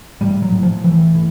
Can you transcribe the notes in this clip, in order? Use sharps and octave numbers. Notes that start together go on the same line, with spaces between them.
A2 G3
F#3
A2
F3
A2 E3
A2